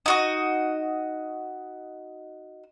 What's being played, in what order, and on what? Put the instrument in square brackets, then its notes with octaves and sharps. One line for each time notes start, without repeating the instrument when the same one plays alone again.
[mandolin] D#4 F#4 D#5